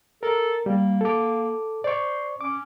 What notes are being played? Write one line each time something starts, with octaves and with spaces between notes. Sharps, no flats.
A4 A#4
G3 A#3
A4 D6
C5 D5 C#6
C#4 D6